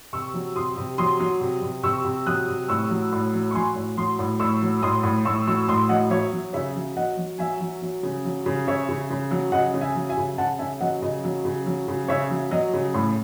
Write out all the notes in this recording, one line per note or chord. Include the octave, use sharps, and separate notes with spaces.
C3 C#6 E6
F#3
C3 C6 D#6
C3
F#3 C6 D#6
F#3
C3
C3
C3 C#6 E6
C3
F#3 D#6 F#6
C3
A2 C#6 E6
F#3
A2
F#3
C#6
F#3 G#5 C6
A2
F#3 C6 D#6
A2
A2 C#6 E6
F#3
A2 C6 D#6
A2
A2 C#6 E6
F#3 C#6 E6
A2 C6 D#6
F#3 D#5 F#5
F#3 C#5 E5
F#3
C#3 C#5 E5
F#3
F#3 D#5 F#5
F#3
F#3 E5 G#5
F#3
F#3
C#3
F#3
C#3
C#3 C#5 E5
C#3
C#3
F#3
C#3 D#5 F#5
C#3
E5 G#5
F#3
E5 G#5
C#3
C#3 F#5 A5
C#3 E5 G#5
F#3 D#5 F#5
C#3 D#5
F#3
C#3
F#3
C#3
C#3 C#5 E5
F#3
F#3 D#5
C#3
A2